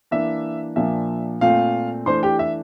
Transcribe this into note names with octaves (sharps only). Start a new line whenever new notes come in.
E3 A#3 D4 E5
A#2 F3 A#3 D4 E5
A#2 A3 C4 F4 F5
E3 A3 D4 C5 C6
G4 G5
E5